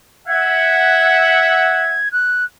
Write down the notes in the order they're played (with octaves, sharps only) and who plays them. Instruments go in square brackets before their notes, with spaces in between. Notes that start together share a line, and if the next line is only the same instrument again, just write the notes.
[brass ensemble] E5 F#5 [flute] G#6
[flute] F#6